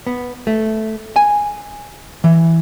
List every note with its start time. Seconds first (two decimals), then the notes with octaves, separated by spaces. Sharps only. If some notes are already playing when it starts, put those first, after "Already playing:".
0.07 B3
0.47 A3
1.16 G#5
2.24 E3